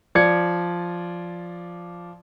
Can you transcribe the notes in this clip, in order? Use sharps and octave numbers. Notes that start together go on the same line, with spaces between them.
F3 D5 G#6 C#7